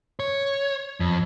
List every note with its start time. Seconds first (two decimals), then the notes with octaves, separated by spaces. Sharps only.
0.20 C#5
1.00 F2